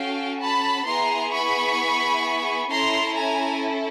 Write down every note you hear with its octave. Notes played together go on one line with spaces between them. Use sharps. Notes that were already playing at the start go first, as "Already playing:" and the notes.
Already playing: C#4 F#4 A4 F5 G5
A5 B5
B3 E4 G#4 A#5 C6
B5 C#6
C#4 E4 A4 A#5 C6
G#5 A#5